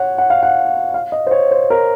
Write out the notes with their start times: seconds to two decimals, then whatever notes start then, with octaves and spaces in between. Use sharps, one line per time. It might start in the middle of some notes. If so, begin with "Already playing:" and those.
Already playing: C#5 F#5
0.18 F#5
0.30 F5
0.43 F#5
0.94 F5
1.12 D#5
1.27 C5
1.31 C#5
1.51 C5
1.70 A#4